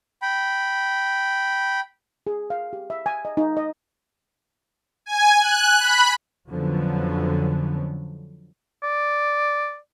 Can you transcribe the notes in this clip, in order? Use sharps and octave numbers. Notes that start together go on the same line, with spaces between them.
G5 B5
G#4
F5
G4
E5
G#5
D#5
D#4
D#5
G#5
F#6
B5
F2 D3 F3 F#3 B3 C#4
D5